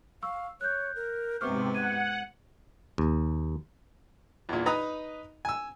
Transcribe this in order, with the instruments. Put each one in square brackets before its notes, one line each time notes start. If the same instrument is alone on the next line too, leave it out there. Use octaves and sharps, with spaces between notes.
[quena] F5 [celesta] C#6 E6
[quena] C#5 [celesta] F#6 G6
[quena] A#4
[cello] G#2 B3 [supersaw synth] C3 [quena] C5 [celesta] C#6 D6 F6
[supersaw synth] F#5 [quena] G#6 [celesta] D#7
[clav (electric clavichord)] D#2
[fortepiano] E2 A#2
D#4 B4 A#5 D#6
G#5 E6